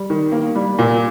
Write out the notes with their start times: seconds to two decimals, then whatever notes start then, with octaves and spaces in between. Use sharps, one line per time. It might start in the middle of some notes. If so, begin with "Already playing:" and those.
Already playing: G3
0.10 D#3
0.32 A#3
0.55 G3
0.79 A#2